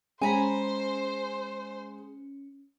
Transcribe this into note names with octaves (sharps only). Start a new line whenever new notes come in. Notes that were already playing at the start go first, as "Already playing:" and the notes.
G#3 C#4 C5 G#5 A#5 B5